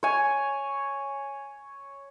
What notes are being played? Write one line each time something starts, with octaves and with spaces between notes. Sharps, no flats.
C#5 G#5